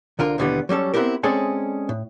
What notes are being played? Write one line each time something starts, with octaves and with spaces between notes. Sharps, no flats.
C2 D3 F4 A#4
D#2 B2 D3 E3 G3 B3
F#3 G3 C#4 A4
B3 C4 E4 F#4 G4 A#4
G#3 C4 C#4 G#4 A4 D5
A2